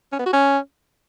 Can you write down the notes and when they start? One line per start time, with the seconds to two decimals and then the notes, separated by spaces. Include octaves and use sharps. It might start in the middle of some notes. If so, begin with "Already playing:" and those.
0.12 C#4
0.19 B3
0.26 F#4
0.33 C#4